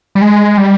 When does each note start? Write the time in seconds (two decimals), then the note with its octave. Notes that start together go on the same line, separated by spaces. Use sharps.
0.15 G3
0.22 G#3
0.58 G3